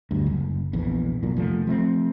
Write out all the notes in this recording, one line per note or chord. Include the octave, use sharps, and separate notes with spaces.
D2 G2
F#1
A#1 E2 E3
B1 A#2
F1 F3 A3
F3 A3 C4